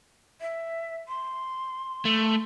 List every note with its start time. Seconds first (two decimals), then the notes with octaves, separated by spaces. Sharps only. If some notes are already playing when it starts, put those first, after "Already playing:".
0.41 E5
1.08 C6
2.05 A3